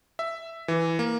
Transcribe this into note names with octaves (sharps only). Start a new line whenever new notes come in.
E5
E3
A#3